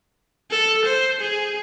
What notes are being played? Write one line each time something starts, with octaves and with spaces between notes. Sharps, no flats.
A4
C5
G#4